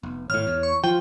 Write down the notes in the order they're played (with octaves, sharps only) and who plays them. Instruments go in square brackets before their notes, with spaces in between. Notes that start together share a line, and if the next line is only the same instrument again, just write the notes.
[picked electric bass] F1 [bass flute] B3
[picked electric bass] G#1 A2 [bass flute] C#5 [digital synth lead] F6
[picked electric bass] E2
[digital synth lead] C#6
[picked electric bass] F3 [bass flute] F4 [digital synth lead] G5